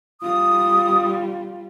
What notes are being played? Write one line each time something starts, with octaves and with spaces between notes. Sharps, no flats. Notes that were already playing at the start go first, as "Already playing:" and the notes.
G3 F4 D#6